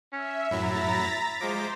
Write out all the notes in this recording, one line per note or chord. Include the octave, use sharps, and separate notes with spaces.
C#4 E5
F#2 A2 F#3 E4 A#5 A6 B6
F3 G#3 C5 D6